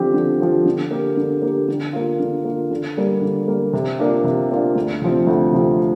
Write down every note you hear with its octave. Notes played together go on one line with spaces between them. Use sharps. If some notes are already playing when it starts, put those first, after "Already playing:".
Already playing: D3 F3 C4 G4
D3
F3 C4 G4
D3
A#3 G4 A#4
D3
A#3 G4 A#4
D3
A#3 F4
D3
A#3 F4
D3
G3 A#3
D3
G3 A#3
C3
A#3 D4 F4
C3
A#3 D4 F4
D2
C3 F3 C4
D2
C3 F3 C4